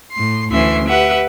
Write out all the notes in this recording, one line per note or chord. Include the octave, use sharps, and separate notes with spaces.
A2 C6
D2 E3 C#4 E5 C6
G4 B4 E5 F#5